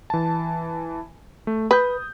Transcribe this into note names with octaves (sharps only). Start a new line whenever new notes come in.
E3 A5
A3
B4 D#6 G6